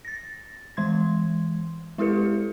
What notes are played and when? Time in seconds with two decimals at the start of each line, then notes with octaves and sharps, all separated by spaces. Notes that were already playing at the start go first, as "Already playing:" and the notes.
0.05 A6 A#6
0.77 E3 G#3 C6 G#6
1.98 G#3 E4 G4 A4 B4 C#7